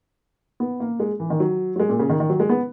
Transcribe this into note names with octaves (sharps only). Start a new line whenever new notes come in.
B3
A#3
G#3
E3
D#3
F#3
F#3
G#3
A#2
C#3
D#3
D#3
F#3
G#3
B3